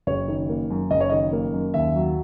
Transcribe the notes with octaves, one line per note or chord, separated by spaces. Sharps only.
F#1 C#5
D#3
A#3
F#2
F#1 D#5
C#5
D#3 D#5
A#3
F#2
D#2 E5
F#3